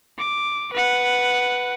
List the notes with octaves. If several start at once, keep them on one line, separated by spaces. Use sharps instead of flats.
D6
B4 F#5